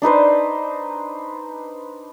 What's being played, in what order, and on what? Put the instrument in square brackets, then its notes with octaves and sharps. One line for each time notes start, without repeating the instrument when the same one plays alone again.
[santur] D4 D#4 B4 C5